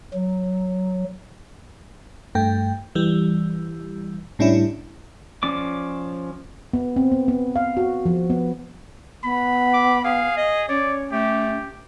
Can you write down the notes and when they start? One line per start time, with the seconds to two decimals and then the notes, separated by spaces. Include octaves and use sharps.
0.14 F#3
2.35 G2 A3 G5
2.95 E3 G3
4.39 A2 G3 C#4 D4 E4
5.43 F3 C#4 D5 D6
6.73 B3
6.96 C4
7.12 B3
7.28 B3
7.56 F5
7.77 F#4
8.06 F3
8.30 B3
9.24 B3 B5
9.74 D6
10.04 G#4 F5
10.37 D#5
10.69 C#4 C#5 D5
11.12 A3 G4